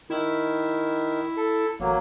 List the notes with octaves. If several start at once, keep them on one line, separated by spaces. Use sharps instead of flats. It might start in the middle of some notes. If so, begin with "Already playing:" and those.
D#3 E4
A4
A1 F#3 A#3